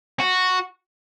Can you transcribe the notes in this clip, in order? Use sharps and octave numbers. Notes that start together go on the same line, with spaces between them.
F#4